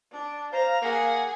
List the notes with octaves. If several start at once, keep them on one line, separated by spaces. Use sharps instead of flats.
D4
C5 F5 A#5
A#3 G#4 F#5 G#5